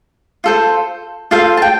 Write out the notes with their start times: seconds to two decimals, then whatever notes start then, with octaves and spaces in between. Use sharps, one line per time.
0.44 F4 A4 C5
1.31 F4 A4 C5 F5
1.57 A5
1.62 G5